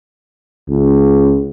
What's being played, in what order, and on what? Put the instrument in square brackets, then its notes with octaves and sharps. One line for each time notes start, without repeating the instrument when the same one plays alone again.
[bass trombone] C#2